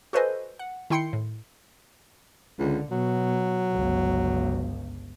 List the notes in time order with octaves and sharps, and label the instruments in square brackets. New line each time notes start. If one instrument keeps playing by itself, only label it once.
[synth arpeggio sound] F#4 A4 B4 C5 D#5 G#5
F#5
D#3 E4 G5 C6 C7 C#7
A2
[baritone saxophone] C#2 [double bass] D3
[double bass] B2 [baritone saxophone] F#3
[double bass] G1 C#2